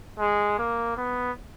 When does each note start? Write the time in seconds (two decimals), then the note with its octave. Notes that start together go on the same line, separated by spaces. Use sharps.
0.19 G#3
0.58 A#3
0.97 B3